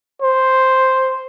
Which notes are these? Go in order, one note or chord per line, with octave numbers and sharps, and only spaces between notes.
C5